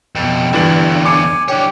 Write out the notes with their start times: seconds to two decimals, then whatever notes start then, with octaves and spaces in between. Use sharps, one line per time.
0.15 F2 B2 G5
0.53 E2 G2 D3 E3 F#7
1.05 G#5 D6 C#7
1.48 D4 G4 C#5